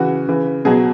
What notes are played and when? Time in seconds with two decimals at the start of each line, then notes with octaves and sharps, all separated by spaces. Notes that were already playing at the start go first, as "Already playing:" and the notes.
Already playing: C#3 E3 F#4
0.28 C#3 E3
0.65 B2 F#3 G#4